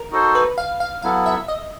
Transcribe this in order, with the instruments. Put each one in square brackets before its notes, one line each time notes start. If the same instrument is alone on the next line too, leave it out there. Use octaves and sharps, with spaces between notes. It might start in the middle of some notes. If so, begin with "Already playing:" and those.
Already playing: [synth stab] A#4
[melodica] D#4 F#4 A4 C5
[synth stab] B4
F5
F5
[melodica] F#3 B3 E4 A4 [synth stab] F5
[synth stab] E5
D#5